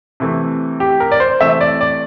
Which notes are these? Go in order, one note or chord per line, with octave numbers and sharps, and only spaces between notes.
C3 E3 A3
G4
A#4
D5
C5
C3 E3 A3 E5
D5
D5